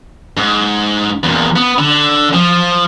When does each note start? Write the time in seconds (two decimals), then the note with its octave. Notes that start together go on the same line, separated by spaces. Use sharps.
0.37 G#2
1.23 E2 A#2
1.56 B3
1.78 D3
2.34 F3